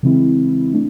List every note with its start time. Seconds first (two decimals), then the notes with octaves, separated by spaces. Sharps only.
0.03 C#3 E3 G#3 C4 E4
0.74 A3 D4